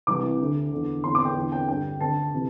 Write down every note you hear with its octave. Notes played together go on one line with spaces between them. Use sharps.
C2 C3 E3 D6
D2 D3
E2 D3
E2 D3 C6
D6
G5
E2 D3
G5
G2 D3 G5
D2 D3 A5
C3 E3